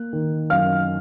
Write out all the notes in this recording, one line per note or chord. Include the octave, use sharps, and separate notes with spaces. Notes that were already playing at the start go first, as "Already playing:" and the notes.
Already playing: A#3 F#6
D#3
F#2 F5 F6